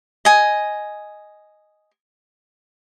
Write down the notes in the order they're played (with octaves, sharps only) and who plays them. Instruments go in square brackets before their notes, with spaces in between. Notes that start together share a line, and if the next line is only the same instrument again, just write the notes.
[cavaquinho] D#5 G#5